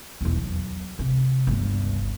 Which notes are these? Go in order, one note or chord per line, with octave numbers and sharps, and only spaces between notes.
B1 E2
F#3
C3
G1 C#2